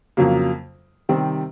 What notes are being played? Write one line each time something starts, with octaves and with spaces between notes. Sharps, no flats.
F2 C#3 F#3 A#3
C3 D#3 G3 C4